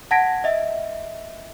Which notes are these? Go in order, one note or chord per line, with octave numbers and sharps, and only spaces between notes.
F#5 A5 G#6 A#6 B6 D7
D#5 E5